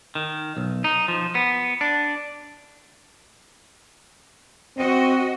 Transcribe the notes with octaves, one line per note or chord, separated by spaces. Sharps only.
D#3
B1
D#4
F3
B3
D4
C4 F#4 D#5